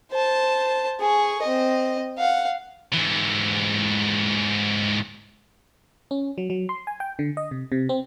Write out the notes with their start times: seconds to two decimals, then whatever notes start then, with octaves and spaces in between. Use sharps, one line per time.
0.11 C5 A5
1.00 G#4 C#6
1.42 C4 D#5
2.18 F5 F#5
2.93 G#2 E3
6.11 C#4
6.38 F#3
6.50 F#3
6.69 C6
6.87 G#5
7.00 G5
7.19 D3
7.37 D#5
7.51 C3
7.72 C3
7.89 C4